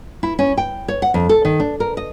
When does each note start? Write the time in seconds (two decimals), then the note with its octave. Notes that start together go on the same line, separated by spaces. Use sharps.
0.23 E4
0.39 C#4
0.58 G5
0.88 C#5
1.02 F#5
1.14 F2
1.29 A4
1.45 D#3
1.60 D4
1.80 A#4
1.97 D#5